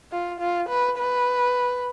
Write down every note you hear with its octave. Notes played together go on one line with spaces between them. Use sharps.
F4
F4
B4
B4